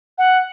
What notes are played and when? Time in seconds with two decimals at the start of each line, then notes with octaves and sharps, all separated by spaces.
0.18 F#5